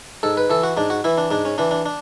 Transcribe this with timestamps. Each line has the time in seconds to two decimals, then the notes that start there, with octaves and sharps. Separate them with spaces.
0.23 G#2 A4
0.37 B4
0.50 E3 A4
0.63 F#4
0.77 G#2 D4
0.90 F#4
1.04 E3 E4
1.18 D4
1.31 G#2 D4
1.45 C#4
1.58 E3 D4
1.71 D4
1.85 D4